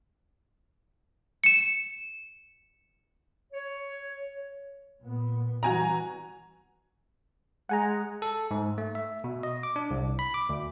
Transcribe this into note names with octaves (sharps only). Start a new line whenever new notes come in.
C#7 E7
C#5
A#2 B3
E3 G3 F#4 G#5 A#5
G#3 F#5 G#5 A#5
A4
G#2
A3
E5
B2
D#5
D6
D4
C2
B5
D6
D2